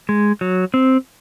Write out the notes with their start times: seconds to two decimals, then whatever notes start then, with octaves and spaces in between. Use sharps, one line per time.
0.09 G#3
0.41 F#3
0.74 C4